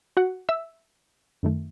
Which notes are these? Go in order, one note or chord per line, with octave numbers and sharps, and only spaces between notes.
F#4 F#5
E5 E6
F#2 D#3 A3